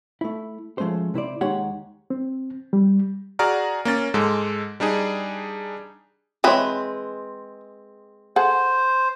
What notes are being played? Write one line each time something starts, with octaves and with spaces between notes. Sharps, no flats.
A3 E4
F3 G#3 A3 C#4 C5
C3 E4 C5 D5
D#2 G#3 D#4 G4 C#5 F#5
C4
G3
F#4 G#4 D5 A#5 F6
A#3 C#4 A6
G#2 G#3 A4
G3 D4 D#4 G#4
E3 G#3 C4 B4 C#5
G#4 A4 C5 F#5